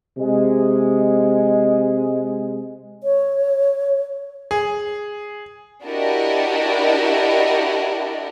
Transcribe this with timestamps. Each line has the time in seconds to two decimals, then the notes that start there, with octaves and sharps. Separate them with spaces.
0.18 C3 G#3
3.03 C#5
4.51 G#4
5.84 D4 E4 F#4 G4 A#4 D#5